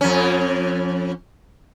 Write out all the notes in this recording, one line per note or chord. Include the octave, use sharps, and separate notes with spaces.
F2 C#4